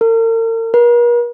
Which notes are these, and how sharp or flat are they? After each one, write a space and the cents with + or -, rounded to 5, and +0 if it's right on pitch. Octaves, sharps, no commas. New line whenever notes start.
A#4 -45
A#4 +45